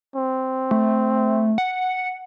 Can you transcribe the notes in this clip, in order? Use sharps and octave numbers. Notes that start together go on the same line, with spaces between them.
C4
A3
F#5